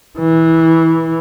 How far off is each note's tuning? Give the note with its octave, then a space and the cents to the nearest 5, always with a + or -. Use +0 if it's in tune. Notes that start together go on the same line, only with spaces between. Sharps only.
E3 -15